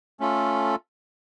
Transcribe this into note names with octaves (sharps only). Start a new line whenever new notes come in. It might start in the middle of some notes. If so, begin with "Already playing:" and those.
A3 C#4 F4 A4